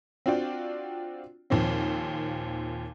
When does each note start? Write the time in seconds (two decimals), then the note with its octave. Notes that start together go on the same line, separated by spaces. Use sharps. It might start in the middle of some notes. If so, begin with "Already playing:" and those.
0.26 C4 D4 F4 F#4 D5 G5
1.50 D#2 A#2 F3 C4